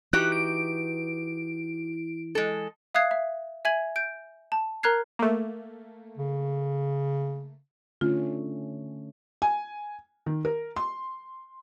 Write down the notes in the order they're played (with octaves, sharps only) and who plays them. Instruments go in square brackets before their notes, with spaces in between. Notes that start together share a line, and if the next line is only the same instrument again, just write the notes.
[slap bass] E3 [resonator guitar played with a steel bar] D#4 F#4 G4 [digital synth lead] F#6
[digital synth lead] D7
[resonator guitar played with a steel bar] G#3 A4
[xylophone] E5 F5 D#6 F#6 G#6 C7
E5
E5 G#5 G#6 F#7
G6 D7
A5
A#4 A#5 F6 F#6 G#6 C7
[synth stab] A3 A#3
[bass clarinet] C#3
[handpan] D3 A3 C#4 [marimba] F4
[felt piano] G#5
D#3
A#4
C6